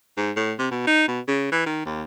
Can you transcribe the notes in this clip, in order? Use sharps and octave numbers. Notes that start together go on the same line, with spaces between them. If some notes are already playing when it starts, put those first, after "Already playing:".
G#2
A2
C3
B2
D#4
B2
C#3
E3
D#3
D#2